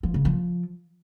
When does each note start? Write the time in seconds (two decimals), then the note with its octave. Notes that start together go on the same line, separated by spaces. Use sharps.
0.03 F3
0.14 C#3
0.25 F3